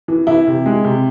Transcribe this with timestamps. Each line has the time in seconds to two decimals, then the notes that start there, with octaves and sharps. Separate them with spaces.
0.08 E3
0.27 E3 E4
0.47 C3
0.66 G#3
0.84 C3